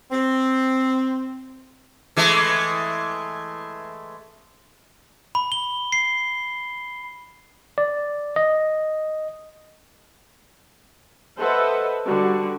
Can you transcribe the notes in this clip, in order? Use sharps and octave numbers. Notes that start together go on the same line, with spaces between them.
C4
E3 G#3 A3
B5
G7
C7
D5
D#5
A4 B4 C5 D#5 E5 F#5
D3 G3 D4 F#4